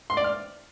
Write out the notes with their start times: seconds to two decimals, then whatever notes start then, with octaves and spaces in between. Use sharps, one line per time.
0.10 C6
0.17 D5
0.24 F6